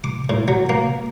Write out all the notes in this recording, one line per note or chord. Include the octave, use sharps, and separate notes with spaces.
D6
A2
F#3
A#3